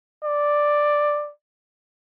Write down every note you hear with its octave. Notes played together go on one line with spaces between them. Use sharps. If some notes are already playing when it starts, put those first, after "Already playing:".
D5